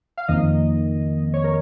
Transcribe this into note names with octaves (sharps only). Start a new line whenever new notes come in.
F5
F2 D#3 A#3 D#5
C#5
A#4